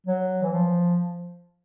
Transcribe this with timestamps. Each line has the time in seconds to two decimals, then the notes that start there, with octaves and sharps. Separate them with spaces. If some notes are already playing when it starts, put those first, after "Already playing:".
0.06 F#3
0.43 E3
0.52 F3